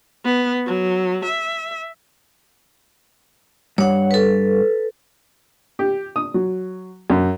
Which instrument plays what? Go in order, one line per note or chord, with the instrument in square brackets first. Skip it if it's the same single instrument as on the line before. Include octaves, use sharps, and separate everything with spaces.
[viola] B3
F#3
E5
[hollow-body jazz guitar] G2 [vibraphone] C#5 F#5
[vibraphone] A4 B4
[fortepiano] G4
D#6
F#3
F#2